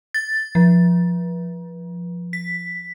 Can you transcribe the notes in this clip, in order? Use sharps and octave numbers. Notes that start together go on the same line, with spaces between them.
A6
F3
B6